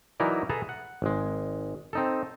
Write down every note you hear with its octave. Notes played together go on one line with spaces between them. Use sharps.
E3 F#3 D#4 E4 A#4 D5
G#4 A4 B4 E5 A5 A#5
F#5
G#1 G#3
C4 D#4 A4